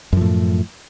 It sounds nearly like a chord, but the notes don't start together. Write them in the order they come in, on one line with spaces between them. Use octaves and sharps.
F#2 F3 A2